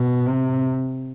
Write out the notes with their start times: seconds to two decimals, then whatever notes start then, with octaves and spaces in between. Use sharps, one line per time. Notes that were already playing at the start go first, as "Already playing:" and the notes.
Already playing: B2
0.26 C3